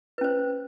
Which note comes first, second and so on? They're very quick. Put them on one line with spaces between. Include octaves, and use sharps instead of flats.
B4 C#4 C5